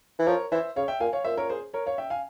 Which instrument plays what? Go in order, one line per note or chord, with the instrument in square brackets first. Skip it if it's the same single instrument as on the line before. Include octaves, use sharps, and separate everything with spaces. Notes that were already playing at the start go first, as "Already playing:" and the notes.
[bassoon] E3
[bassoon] F3 [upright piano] A#4 C#5
[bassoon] E3 [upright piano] C5 E5
[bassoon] C#3 [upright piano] C#5 F5
[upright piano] E5 G5
[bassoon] A#2 [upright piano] F5 G#5
[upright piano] C#5 F5
[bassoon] A#2 [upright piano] C5 E5
[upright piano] A#4 C#5
G#4 C5
A#4 C#5
C#5 F5
E5 G5
F5 G#5